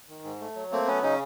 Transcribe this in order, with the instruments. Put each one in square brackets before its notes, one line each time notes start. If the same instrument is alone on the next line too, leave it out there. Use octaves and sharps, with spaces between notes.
[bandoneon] D#3
G#2
A3
F#3
A3 A#3 C4
F#3 B3 C#4
C#3 C#4 D#4